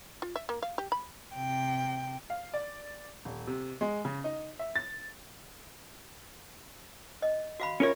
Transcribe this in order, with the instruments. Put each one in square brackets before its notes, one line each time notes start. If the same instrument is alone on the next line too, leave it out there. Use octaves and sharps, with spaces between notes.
[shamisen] F4
E5
A#3
F5
G4
B5
[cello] C3 G5
[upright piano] F5
D5
D#1
C3
G#3
C#3
D#4
E5
A6
[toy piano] D#5
F#4 F5 B5
[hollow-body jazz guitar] C#4 A#4 C#5 [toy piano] F4 E5